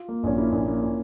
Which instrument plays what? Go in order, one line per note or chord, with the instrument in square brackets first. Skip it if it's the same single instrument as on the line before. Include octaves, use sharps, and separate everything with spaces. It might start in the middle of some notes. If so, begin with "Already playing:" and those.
Already playing: [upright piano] F4
[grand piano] A#3
[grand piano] A#1 [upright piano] C#4
[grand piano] A#3 [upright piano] E4
[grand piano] A#1
A#3
A#2